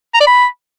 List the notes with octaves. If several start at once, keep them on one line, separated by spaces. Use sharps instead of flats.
A#5
D5
B5